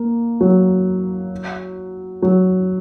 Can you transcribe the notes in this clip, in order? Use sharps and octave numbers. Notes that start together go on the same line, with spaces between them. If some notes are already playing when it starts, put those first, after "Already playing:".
Already playing: A#3
F#3
F#3